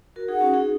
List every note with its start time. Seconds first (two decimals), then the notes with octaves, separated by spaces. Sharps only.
0.16 F#4 A#4
0.28 D#4 G#4 F#5
0.41 C#4 F#4
0.54 D#4 G#4